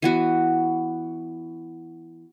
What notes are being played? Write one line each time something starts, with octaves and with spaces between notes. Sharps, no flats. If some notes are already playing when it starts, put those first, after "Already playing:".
E3 B3 F#4